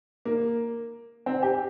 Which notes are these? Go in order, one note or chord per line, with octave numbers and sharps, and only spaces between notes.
A#3
C4
G4